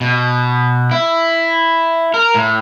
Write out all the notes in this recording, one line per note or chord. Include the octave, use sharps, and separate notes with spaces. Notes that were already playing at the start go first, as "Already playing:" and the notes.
B2
E4
A#4
A2